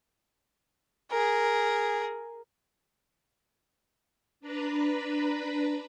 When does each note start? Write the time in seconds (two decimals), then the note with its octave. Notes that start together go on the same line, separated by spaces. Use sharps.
1.11 G#4 A#4
4.40 D4 B4 A#5 B5